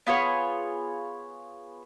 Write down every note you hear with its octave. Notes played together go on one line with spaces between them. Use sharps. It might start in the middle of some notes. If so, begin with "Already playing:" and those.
B3 F4 G#4 C#5